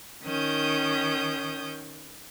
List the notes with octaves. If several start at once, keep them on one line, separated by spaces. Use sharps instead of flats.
D#3 C#4 D#6 G6